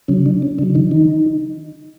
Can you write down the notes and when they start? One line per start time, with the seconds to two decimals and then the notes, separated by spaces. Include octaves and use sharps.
0.08 C#3 F#3 C#4
0.26 D4
0.42 C#4
0.58 C#3 F#3 D4
0.75 D#3 D#4
0.91 D#3 D#4